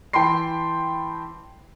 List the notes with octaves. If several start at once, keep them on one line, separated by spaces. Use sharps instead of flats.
E3 G5 A5 B5 C6 C7